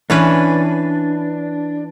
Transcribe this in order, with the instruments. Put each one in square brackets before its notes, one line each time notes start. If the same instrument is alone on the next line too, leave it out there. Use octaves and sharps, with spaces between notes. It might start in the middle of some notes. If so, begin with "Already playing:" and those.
[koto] E3 C#4 B4 [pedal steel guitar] D4